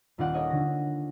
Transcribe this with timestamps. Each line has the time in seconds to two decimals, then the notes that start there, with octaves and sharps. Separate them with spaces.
0.18 D#1 D#3 F4 D5 F#5 F#6
0.34 A4 A#4 C#5 D#5 G#5
0.50 D3 A#6